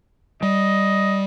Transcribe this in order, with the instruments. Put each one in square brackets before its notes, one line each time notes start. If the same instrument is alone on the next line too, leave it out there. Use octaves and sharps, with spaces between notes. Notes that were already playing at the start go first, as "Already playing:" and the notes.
[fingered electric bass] G3 [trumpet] D#5